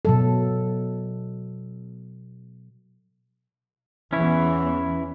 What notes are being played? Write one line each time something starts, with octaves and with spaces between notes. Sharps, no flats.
B2 F#3 A4
E2 E3 C#4 E4 C#5